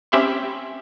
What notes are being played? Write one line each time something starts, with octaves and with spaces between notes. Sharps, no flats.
C4 C#4 G4 E5 B5 C6